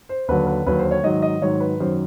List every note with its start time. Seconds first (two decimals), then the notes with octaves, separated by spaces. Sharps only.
0.09 C5
0.28 D#2 D3 F#3 B4
0.47 B4
0.66 D#2 D3 F#3 B4
0.79 C5
0.91 C#5
1.03 G#2 D#3 F#3 D#5
1.22 D#5
1.42 G#2 D#3 F#3 C#5
1.60 B4
1.80 F#2 D#3 F#3 C5